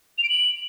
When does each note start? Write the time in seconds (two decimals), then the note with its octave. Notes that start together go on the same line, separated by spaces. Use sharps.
0.18 F7
0.24 D7
0.29 F#7